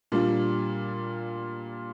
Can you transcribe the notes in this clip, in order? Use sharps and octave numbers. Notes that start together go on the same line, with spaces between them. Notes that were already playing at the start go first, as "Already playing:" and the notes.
A#2 G3 D4 F4